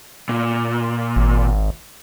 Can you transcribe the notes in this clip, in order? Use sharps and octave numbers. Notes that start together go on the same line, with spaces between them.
A#2
G#1